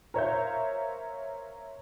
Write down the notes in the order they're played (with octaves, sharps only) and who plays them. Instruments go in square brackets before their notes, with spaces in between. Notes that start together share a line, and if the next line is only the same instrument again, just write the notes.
[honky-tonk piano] A#4 C5 C#5 E5 F5 G6